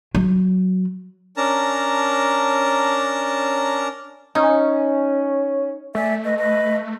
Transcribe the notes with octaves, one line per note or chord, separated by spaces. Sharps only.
F#3
C#4 D4 A#4 A5 A#5
C#4 D#4
A3 D5 E5 G#5
B4 D#5
B4 D#5